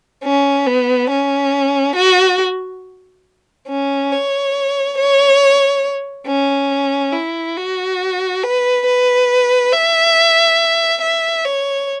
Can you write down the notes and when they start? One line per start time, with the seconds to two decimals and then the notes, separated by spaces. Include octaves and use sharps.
0.24 C#4
0.67 B3
1.10 C#4
1.96 F#4
3.68 C#4
4.11 C#5
4.98 C#5
6.27 C#4
7.13 E4
7.56 F#4
8.43 B4
8.86 B4
9.72 E5
11.01 E5
11.45 C#5